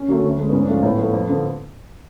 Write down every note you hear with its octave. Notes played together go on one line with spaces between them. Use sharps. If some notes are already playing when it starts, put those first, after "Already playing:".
Already playing: C#4
D3 F#3 A3
D2
D3 G#3
B3
G#2 C#4
D4
F3 A3 F4
A2 B3
F3 A3
F2
D3 F3